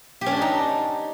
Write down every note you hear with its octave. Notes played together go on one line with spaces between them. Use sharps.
G4
C#4
D4
G4
D#4